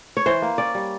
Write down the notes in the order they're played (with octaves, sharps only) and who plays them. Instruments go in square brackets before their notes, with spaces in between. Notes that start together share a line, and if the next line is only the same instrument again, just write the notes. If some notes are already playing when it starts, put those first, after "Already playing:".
[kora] C#5
E3 C5
A#3
C#4 D5
G3